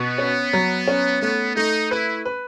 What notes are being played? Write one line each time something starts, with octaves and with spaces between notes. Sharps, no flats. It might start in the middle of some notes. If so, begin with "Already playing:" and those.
Already playing: B2 B3
C#4
F#3
C#4
A3 B3
A3 D#4
E4 B4
B4